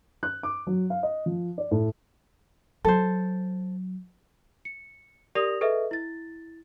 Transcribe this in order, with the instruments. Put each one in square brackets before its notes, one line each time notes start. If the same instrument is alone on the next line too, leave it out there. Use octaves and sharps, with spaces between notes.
[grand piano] F#6
D6
F#3
F5
D#5
F3
D5
A2
[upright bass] F#3 [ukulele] A4 C5
[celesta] C#7
G4 A#4 D5 D#6 A#6 F7
G#4 A4 B4 D#5 E5
E4 A6